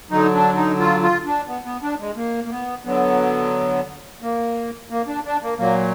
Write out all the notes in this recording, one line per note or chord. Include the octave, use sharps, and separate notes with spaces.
D3 F#3 D#4
D4
D#4
F4
F4
D4
B3
B3
D4
G#3
A#3
A#3
B3
D3 F#3 B3
A#3
A#3
D4
D4
A#3
A#2 F#3 A#3